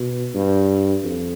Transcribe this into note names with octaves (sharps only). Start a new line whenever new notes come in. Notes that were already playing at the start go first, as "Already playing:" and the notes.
Already playing: B2
G2
F2